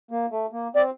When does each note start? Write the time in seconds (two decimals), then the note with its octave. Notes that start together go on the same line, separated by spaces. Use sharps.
0.11 A#3
0.31 A3
0.53 A#3
0.75 C4 D5